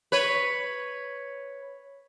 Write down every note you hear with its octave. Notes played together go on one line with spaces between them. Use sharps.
B4 C#5